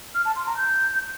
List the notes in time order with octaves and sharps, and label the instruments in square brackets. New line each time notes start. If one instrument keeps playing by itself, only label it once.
[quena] F6
A5
C6
A#5
G6